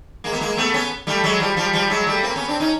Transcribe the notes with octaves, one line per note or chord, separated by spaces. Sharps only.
G#3 A#3
B3
G#3 A#3
A3 B3
B3 C#4
G3 A3
F#3 G#3
F3 G3
F3 G3
F3 G3
F#3 G#3
G3 A3
A#3 C4
B3 C#4
C4 D4
C#4 D#4